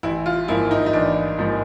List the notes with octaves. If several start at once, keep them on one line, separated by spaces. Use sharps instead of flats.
A1 E4
F4
G#2 F3 A#3 E4
D#4
D#4
A1 D4
G#2 F3 A#3